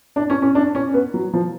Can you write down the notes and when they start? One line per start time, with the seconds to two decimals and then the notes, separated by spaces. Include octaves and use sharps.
0.16 D4
0.30 C#4
0.42 C#4
0.55 D4
0.75 C#4
0.94 B3
1.14 F#3
1.33 F3